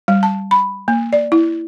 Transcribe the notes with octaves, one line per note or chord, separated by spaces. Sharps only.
G3
A5
B5
A#3
D5
E4